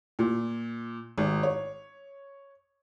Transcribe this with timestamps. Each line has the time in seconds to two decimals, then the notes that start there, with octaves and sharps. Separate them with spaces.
0.19 A#2
1.18 G#1
1.43 C#5